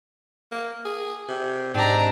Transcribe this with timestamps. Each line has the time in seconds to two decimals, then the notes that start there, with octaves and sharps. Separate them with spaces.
0.51 A#3
0.85 G#4
1.29 C3
1.74 G#2 C4 D4 G4 A#5